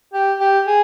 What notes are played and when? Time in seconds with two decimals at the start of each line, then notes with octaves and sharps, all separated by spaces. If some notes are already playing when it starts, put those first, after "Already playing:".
0.14 G4
0.40 G4
0.67 G#4